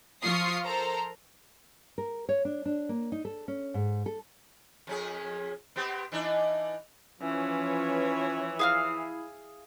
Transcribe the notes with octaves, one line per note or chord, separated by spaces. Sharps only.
F3 F4 C#6 D#6 C7
A4 A#4 C5 A#5
A#4
C#5
D4
D4
A#3
D#4
A4
C#4
G#2
A4
F2 C#4 G#4
B3 C4 G4
E3 D4 D#4
E3 F3 C#4 B4 C#5
E4 G#4 F5 F6